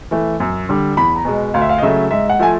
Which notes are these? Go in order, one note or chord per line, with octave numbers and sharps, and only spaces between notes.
E3 A3
F#2
D3 G3
E2 B5
A#5
B2 G#3
D2 F5
E5
F5
D#5
C#3 F#3 A3 E5
G#2 E5
F#5
F3 A3 G#5